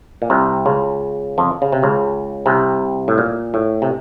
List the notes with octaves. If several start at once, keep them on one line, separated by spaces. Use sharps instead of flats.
A#2
C2 C3
C#2 C#3
F2 F3
C#3
C3
C#2 C#3
C2 C3
A2
A#2
A2
C3